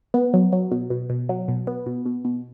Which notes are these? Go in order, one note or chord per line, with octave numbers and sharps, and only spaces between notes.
B3
F#3
F#3
B2
B2
B2
F#3
B2
B3
B2
B2
B2